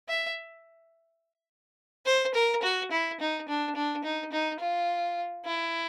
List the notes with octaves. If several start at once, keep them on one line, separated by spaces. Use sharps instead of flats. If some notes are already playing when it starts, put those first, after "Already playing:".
E5
C5
A#4
F#4
E4
D#4
D4
D4
D#4
D#4
F4
E4